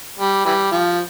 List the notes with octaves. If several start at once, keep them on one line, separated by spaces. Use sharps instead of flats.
G3
E3 G3
F3